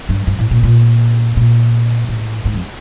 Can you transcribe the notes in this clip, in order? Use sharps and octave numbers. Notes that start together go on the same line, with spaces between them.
G2
G2
A2
A#2
A#2
A#2
A2
G#2
F2